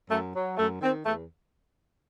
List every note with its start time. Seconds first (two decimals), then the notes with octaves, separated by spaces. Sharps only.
0.09 F#2 A3
0.34 F#3
0.57 F#2 A3
0.81 D#3 C4
1.05 E2 A3